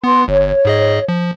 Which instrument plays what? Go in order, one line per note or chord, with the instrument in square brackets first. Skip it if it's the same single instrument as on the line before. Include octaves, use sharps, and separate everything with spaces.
[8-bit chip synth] B3 [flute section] B4 C6
[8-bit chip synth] G1 [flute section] C#5
[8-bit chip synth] G#2 G#4 D#5
F3